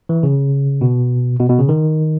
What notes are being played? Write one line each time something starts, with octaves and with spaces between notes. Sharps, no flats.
E3
C#3
B2
B2
B2
C#3
D#3